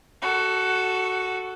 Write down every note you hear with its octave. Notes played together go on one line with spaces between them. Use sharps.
F#4 A4